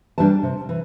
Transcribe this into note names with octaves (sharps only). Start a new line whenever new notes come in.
E3 G3 D4 A5
C3
E3